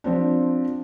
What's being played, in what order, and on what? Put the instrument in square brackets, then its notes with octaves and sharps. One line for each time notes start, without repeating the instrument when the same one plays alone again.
[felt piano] F3 C4 D4